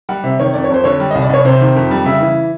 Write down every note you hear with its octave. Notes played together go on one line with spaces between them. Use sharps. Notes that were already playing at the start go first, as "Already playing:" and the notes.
G3 F#5
C3 E5
D#3 C#5
F2 D5
C#5
F2 C5
D3 C#5
G3
C2 D#5
D5
C2 C#5
C3 C5
D#3
F2
G3
C#3 E5
E3